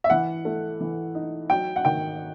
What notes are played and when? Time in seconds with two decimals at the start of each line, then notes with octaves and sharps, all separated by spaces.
0.04 E5
0.10 E3 F#5
0.45 A3
0.80 E3
1.15 D#4
1.50 F#3 G5
1.76 F#5
1.85 D#3 G5